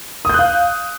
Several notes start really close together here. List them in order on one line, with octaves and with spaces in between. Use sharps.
D#6 G6 F#6 F5